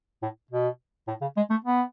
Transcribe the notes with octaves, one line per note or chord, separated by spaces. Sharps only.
A2
B2
A2
C#3
G#3
A3
B3